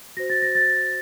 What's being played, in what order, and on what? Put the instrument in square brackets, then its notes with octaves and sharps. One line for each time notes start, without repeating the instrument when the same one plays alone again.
[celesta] F#4 C5 A#6
A6
A#6
A6